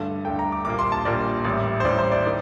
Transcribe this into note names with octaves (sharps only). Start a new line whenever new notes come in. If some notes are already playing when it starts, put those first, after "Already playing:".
Already playing: G2 D3 A3
G2 D3 A3 G5
A#5
D6
A#1 A#2 G3 A#3 D6
C6
A5
A#1 A#2 G3 A#3 D5
A1 A2 G3
C5
A1 A2 G3 D5
C5
D5
D#3 D5